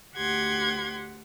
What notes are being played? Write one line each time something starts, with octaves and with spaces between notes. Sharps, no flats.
D2 G4 F#5 C6 G#6